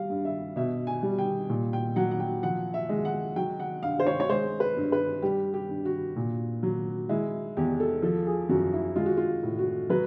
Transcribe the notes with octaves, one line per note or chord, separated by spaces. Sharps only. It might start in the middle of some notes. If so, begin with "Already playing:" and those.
Already playing: G3 F5
G2
E5
B2 E5
G#5
G3
G5
A#2
G5
F#3 F#5
F#5
G5
F3 F#5
E5
G#3
F#5
F#3 G5
F#5
G2 F5
C5
C#5
C#5
G#3 C5
B4
G2
B4
G3 G4
G4
G2
F#4
A#2
F#3
G#3 E4
E2 G4
A4
F3 A4
G#4
F#2 F#4
E4
G#3 F4
F#4
F4
A2
F#4
F#3 B4